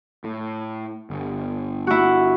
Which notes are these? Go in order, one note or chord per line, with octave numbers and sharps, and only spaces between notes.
A2
G1
E4 F#4